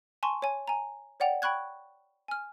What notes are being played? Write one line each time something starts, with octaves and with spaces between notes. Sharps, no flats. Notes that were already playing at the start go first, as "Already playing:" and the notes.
G#5 A5 C6 C#6
C#5 G#5
G#5 A#5
C#5 D5 F#5 G5 F7
G5 B5 C#6 F#6 G#6
G#5 F6